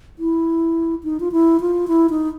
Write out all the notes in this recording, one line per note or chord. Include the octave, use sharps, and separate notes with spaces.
E4
D#4
F4
E4
F4
E4
D#4